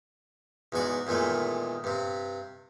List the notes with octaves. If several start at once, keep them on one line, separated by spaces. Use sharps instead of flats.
E2 G#2 F#4 D5
E2 A#2 D#3 G#3 A3
G2 C3